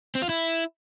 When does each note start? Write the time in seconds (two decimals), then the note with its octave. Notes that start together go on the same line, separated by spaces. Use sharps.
0.15 C4
0.22 F4
0.29 E4